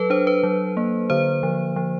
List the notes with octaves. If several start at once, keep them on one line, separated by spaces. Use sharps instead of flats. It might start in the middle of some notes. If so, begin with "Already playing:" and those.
Already playing: F#3 A4 B4
D4 C5
B4
F#3
A#3
D3 C5
F3
F3